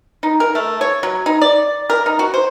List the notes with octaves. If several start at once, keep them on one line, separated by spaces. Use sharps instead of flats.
D#4
A#4
A3
C#5
F#3
D#4
D5
A#4
D#4
F#4
C5